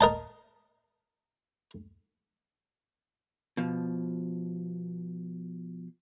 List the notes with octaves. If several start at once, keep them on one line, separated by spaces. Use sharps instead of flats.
A#4 D#5 A5
B2 F3